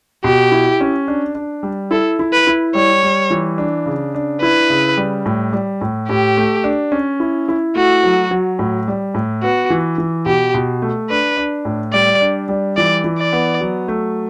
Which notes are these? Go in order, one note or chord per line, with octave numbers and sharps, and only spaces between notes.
B2 G4
E4
C#4
D4
D4
G3
E4 A4
E4
B4
E4
G3 C#5
G3
E3
D4
C#3
D4
E4 B4
C#3
G3
A2
G3
A2
A2 G4
A3
D4
C#4
E4
E4
A3 F#4
F#3
F#3
A2
G3
A2
B3 F#4
E3
E3
B2 G4
B2
A3
D4 B4
D4
A2
G3 D5
D4
G3
E3 D5
E3
D5
B3
F#3
A3